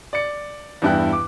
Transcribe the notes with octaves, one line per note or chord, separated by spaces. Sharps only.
D5 C#7
E2 G2 D4 E4 G5 F#6
D6